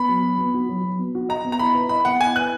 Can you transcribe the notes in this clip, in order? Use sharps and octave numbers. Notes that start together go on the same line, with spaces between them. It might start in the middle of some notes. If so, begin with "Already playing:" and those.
Already playing: B3 B5
F#3
F#3
B3
F#4
F#3
F#3
B3
F#4
D#5 A#5
B3
A#5
E4 B5
B4
D#5 B5
B3 F#5
E4 G#5
B4 F#6